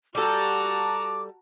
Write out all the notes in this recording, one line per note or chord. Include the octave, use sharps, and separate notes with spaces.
G3 F#4 A4 A5 A#5 D6